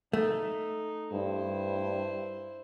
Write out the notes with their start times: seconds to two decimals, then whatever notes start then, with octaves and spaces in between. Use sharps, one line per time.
0.13 A3 D#4
1.12 G2 E4 C5